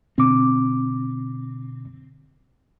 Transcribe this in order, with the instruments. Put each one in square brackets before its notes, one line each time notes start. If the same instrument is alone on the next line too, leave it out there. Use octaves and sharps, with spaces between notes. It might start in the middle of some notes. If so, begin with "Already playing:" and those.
[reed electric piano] B2 D3 D6 [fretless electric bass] C4